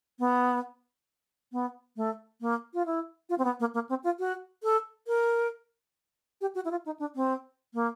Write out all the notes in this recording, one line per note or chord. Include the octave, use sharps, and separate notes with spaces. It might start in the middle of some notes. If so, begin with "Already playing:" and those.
B3
B3
A3
A#3
F4
E4
F4
C4
B3
A#3
A#3
C4
F4
F#4
A4
A#4
G4
F#4
E4
F4
D#4
D4
C4
A#3